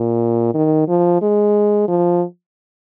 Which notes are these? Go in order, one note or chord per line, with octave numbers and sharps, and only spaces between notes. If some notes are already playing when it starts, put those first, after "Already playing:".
Already playing: A#2
D#3
F3
G#3
F3